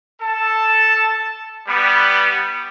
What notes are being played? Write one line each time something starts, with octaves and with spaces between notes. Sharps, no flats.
A4 A5
G3 B3